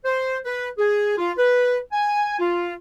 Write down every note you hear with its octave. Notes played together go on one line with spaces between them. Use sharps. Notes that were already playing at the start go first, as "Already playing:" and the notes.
C5
B4
G#4
F4
B4
G#5
F4